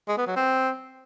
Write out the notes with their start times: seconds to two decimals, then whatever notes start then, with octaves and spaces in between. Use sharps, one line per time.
0.08 G#3
0.17 B3
0.27 F#3
0.36 C4